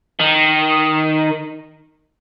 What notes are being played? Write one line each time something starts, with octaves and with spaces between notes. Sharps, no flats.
D#3